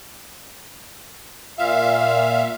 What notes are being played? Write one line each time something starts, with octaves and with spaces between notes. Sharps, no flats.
A#2 E5 F5